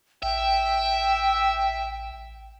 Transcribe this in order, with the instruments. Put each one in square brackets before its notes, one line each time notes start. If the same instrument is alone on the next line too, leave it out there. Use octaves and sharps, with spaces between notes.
[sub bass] A1 [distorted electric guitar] E5 [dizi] G5